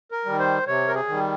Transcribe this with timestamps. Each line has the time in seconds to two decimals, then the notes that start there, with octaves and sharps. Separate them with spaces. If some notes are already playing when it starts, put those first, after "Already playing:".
0.11 A#4
0.25 D#3 G3
0.39 C5
0.67 C3 C#5
0.88 A#4
0.95 G#4
1.08 D#3 G3